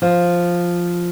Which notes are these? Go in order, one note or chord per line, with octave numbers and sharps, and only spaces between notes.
F3